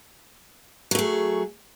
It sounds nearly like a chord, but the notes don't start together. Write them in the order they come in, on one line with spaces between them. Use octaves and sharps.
F#3 A3 G#4